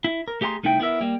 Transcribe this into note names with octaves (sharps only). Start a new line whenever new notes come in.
E4
A#4
A3 G4 G#4 G5 A#5 C6
C2 A3 D#4 E4 G5
B3 E4 A#4 E5
G3 A#3